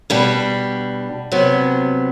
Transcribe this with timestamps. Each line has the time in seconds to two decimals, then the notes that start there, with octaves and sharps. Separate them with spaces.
0.10 B2 G3 D4
1.32 C3 F#3 B3